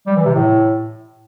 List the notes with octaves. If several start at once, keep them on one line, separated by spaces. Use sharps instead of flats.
G3
E3
C3
A2